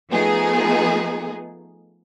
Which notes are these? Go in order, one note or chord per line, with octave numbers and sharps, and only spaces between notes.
F3 A3 B3 D#4 G#4